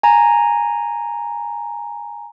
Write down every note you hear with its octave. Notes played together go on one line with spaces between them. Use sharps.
G#5 A#5